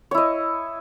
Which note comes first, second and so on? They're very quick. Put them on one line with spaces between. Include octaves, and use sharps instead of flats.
C#5 E4 D#5